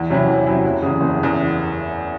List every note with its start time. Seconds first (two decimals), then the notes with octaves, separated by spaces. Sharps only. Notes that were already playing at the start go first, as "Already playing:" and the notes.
Already playing: E2
0.10 C3 F#3 C#4 E4
0.28 E2
0.46 C3 F#3 C#4 E4
0.64 F#1
0.82 E2 C#3
1.00 F#1
1.19 E2 C#3